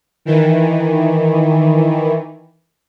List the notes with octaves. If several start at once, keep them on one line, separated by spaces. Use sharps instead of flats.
D#3 E3